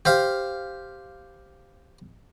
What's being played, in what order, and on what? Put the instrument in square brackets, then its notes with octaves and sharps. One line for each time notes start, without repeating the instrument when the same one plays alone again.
[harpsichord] G4 C5 F5